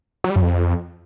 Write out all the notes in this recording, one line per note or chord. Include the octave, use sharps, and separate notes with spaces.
F#3
G3
F#2
F2